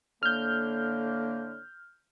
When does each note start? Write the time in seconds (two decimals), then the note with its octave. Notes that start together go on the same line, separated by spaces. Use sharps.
0.23 A2 D3 A#3 F6 G6